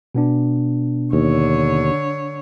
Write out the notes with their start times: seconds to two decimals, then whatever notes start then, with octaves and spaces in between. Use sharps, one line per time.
0.15 B2 B3 D4
1.13 D#2 D3 C#5